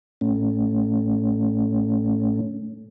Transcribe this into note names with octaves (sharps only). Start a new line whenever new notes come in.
A2 A3 C#4